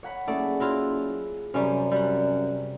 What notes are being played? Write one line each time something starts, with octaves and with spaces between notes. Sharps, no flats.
C#5 F#5 B5
F#1 A3 G#4 D5
F#3 E4 F4
F#2 C3 G3 C#4
G3 F#5